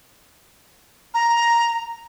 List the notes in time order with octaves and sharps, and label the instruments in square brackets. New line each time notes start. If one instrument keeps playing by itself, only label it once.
[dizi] A#5